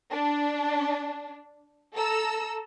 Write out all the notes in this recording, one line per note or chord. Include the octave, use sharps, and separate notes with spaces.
D4
A4 A#5 E6